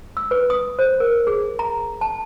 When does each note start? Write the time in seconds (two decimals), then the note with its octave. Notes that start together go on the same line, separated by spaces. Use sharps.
0.17 E6
0.31 B4
0.50 D#6
0.79 C5
1.00 A#4
1.27 G#4
1.59 A#5
2.01 A5